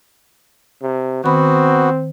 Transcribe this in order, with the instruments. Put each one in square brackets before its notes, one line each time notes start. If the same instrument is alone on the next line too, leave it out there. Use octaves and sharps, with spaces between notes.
[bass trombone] C3
[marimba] D#3 B5 [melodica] B3 F#4 [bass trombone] C4